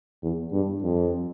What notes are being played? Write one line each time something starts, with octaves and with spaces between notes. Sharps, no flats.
E2
G2
F2